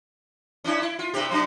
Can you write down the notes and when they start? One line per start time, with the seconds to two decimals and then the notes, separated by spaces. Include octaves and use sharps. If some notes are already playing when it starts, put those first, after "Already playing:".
0.64 C#4 D4 E4
0.82 E4
0.99 F4
1.13 G2 C3 G4
1.29 C3 F#3 D4